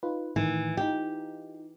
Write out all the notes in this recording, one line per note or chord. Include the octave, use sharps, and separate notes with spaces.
D#4 F4 B4
A2 D#3 E3
D#4 F4 G4